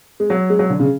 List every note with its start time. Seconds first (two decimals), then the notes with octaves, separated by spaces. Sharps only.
0.20 G#3
0.30 F#3
0.50 G#3
0.59 F#3
0.70 D3
0.80 C#3